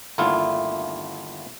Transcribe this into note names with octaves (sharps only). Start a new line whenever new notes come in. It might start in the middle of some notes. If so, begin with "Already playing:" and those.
G1 D#2 A3 E4 F4